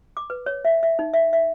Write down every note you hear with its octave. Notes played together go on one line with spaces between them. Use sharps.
D6
B4
C#5
E5
E5
D#4
E5
E5